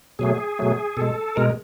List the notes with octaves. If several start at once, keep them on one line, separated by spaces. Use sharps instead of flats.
B2 F#3 A3 G#4
B2 F#3 A3
B2 G#3 A4
B2 G#3 A#4